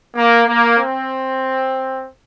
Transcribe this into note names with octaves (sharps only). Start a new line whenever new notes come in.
A#3
A#3
C4